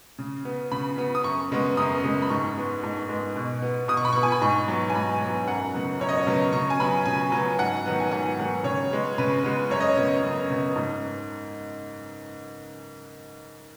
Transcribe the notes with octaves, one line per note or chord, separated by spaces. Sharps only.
C#3
B3
C#3 B5
B3
D#6
F#2 C#6
C#3 G#3 B3
F#2 D#6
C#3 G#3 B3
B5
G#2 C#6
G#3 B3
G#2
G#3 B3
B2
B3
B2 D#6
C#6
B5
B3 C#6
G#5
B5
G#2 C#6
F#3 B3
G#5
G#2 B5
F#3 B3
F#2 F#5
C#3 F#3 B3
F#2 C#5
D#5
C#5
C#3 F#3 B3
C#3 C#6
G#5
F#3 B3 B5
C#3 G#5
F#3 B3
G#2 F#5
D#3 F#3 B3
G#5
G#2 F#5
D#3 F#3 B3
C#3 C#5
G#3 B3
C#3 B4
G#3 B3
F#2 C#5
D#5
C#5
C#3 B3
F#2
C#3 B3
G#2